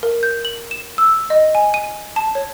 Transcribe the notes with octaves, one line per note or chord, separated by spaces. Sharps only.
A#4
G6
F#7
E7
E6
D#5
G#5
D#7
A5
C#5